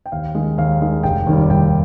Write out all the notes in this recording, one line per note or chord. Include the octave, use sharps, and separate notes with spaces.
G5
D#2 F5
D#3 G#3
D#2 F5
D#3 G#3
F1 G5
D#2 D#3 G3
F1 G5